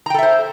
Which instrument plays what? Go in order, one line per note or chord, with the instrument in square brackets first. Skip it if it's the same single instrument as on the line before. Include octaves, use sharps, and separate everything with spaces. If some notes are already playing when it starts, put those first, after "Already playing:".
[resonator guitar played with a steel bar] A#5
G5
A4
E5
C5